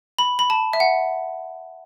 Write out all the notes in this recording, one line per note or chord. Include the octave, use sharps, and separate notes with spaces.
B5
B5
A5
E5
F#5